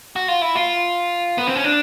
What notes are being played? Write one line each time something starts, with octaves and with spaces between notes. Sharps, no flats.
F#4
F4
E4
F4
B3
C4
C#4
D4